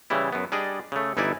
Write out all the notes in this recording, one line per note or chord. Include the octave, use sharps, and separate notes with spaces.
C#3 E3 G3 E4
F#2 B3
G3 D4 G#4 D5 D#5
C#3 A3
G1 E3 D#4 E4 D5 G#5